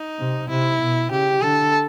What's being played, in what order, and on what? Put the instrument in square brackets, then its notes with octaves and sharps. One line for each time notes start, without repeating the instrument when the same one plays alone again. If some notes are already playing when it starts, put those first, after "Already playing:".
Already playing: [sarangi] D#4
[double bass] C3
[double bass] C3 [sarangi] E4
[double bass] B2
[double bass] C#3 [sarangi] G4
[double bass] D3 [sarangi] A4